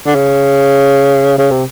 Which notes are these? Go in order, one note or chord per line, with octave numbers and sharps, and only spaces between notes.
D3
C#3
C#3
C3